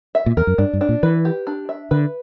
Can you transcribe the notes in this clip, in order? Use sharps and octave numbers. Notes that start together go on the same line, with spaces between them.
E5
A#2
E2 A#4
F#2
G2 D4
G2
D4
A#2
E3 B4
G4
D4
E5
D3 B4